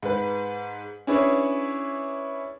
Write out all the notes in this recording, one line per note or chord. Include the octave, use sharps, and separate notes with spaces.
G#2 B4
C#4 D4 E4 G#4 B4 C#5